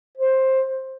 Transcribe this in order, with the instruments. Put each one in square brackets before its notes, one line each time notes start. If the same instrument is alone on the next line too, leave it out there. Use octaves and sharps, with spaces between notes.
[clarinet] C5